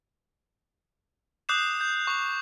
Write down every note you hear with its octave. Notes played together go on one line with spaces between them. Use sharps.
D6 D#6 F#6 G6 C7 E7
G6
C#6 F7